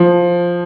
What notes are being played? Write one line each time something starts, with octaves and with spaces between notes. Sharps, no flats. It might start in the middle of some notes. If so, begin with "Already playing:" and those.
Already playing: F3